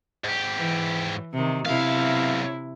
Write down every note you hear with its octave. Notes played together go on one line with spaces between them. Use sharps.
G#2 G4
E3
C3 D#3
B1 C3 E4 F5